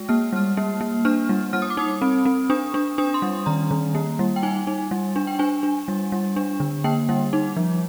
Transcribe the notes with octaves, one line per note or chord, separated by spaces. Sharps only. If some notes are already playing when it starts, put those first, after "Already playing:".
Already playing: G#3
A#3 F6
G3 F6
A#3
A#3
D4 F6
G3
G3 F6
D#6
D6
D#4 D#6
C4
C4
D4 D#6
D4
D4 D#6
C6
G3
D#3 A#5
D#3
A#3
G3
G5
D#4 G#5
D#4
G3
D4
G5
D4 G#5
D4
G3
G3
D4
D3
A#3 G5
G3
D#4
F3